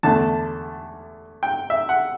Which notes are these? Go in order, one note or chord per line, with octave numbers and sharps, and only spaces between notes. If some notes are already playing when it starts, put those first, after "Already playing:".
E2 D3 A3 A5
G5
E5
F#5